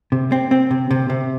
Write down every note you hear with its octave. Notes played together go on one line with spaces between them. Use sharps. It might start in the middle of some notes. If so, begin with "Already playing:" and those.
C3
C4
C4
C3
C3
C3